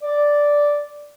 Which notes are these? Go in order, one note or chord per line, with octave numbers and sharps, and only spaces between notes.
D5